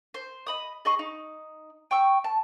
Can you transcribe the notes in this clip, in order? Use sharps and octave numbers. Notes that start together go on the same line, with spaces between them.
C5
D#5 B5 D#6
G#4 D#5 B5 C#6
D#4
G5 C#6 E6
A5